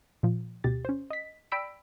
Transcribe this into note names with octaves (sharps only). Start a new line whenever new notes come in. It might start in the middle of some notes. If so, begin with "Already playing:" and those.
A#2 F3
D2 B2 G4 A6
C#4 C5
D#5 B6
D5 G5 B5 E6 B6 D7